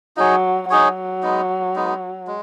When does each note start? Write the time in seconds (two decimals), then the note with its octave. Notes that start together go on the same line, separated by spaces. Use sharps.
0.17 F#3 D#4 G#4 C#5
0.70 F#3 D#4 G#4 C#5
1.23 G#3 B3 D#4
1.76 G#3 B3 D#4
2.27 G#3